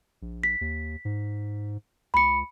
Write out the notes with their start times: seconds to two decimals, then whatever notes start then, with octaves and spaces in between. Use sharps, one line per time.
0.22 A#1
0.44 B6
0.61 D#2
1.05 G#2
2.14 C#2 B5 C#7